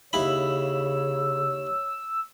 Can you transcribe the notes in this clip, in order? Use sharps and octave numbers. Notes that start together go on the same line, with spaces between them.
D#2 C#3 E4 C#5 B5 E6